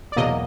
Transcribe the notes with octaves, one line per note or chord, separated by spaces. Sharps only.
D5
E2 B2 F#3 A#3 D#5